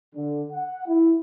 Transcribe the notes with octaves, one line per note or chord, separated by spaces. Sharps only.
D3
F#5
E4